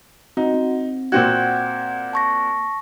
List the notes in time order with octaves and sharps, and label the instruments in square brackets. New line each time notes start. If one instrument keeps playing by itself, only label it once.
[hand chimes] C4 F#4 [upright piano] D#4
[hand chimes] C4
[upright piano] A#2 C4 F#4 [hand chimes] F#5 G6 G#6
[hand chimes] A5 C#6 A#6